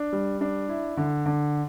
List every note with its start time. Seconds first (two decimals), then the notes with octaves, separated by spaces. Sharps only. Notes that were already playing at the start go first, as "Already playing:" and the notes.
Already playing: D4
0.13 G3
0.41 D4
0.69 E4
0.97 D3
1.26 D3